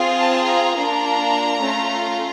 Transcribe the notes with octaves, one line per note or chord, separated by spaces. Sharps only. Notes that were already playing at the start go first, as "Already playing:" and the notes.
Already playing: C4 F4 G#4
A5
A#5
A#3 D4 F4
A3 C#4 F4